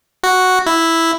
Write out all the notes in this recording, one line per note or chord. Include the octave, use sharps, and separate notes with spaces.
F#4
E4